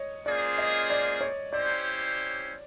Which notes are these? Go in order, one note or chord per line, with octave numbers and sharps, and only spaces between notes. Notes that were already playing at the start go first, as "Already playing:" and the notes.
Already playing: C#5 D#5
A#3 C#4 F4 G#4 C5 D5
D#5
D5
C#5
C#4 E4 G4 C5 D5